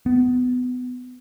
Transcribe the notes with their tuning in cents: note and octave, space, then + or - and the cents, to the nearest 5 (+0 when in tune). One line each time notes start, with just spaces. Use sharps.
B3 +25